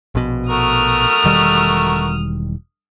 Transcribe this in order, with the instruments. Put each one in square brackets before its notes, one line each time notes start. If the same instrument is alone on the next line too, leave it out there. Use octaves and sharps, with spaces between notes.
[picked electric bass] A#1 B2
[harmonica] A3 F#4 A#4 [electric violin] D#6 F6
[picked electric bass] E1 D#3 G3